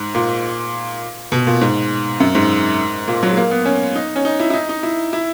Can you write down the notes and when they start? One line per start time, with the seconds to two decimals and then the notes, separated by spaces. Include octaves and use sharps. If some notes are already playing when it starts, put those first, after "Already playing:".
Already playing: G#2
0.15 A#2
1.32 B2
1.47 A#2
1.61 G#2
2.20 F#2
2.35 G#2
3.08 A#2
3.23 F#3
3.31 G#3
3.37 A#3
3.51 B3
3.65 C#4
3.95 D#4
4.16 C#4
4.25 D#4
4.40 E4
4.50 E4
4.54 D#4
4.69 D#4
4.83 E4
5.13 E4